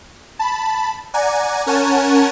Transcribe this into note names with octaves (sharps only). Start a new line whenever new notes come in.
A5 B5
D5 F#5 G#5 A#5
C#4 A#4 C#5 F#5 G#5 A5